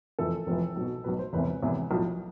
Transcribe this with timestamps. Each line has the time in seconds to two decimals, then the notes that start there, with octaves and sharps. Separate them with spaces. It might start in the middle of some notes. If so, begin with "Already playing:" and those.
0.19 F1 F2 E3 A4
0.47 F1 F2 E3
0.76 B1 B2
1.04 B1 B2 B4
1.19 C5
1.33 E1 E2 C3 E3 B4
1.62 E1 E2 C3 E3
1.91 B1 A2 F3